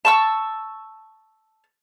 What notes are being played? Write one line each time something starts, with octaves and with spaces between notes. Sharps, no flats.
A5 C#6 E6